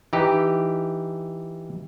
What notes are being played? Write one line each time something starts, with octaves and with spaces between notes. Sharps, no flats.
E3 D#4 G4